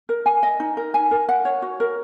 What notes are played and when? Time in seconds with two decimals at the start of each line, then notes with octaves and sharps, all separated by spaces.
0.09 A#4
0.26 G#5
0.43 D#5
0.60 D#4
0.77 A#4
0.94 G#5
1.11 A#4
1.29 F#5
1.45 C#5
1.62 F#4
1.80 A#4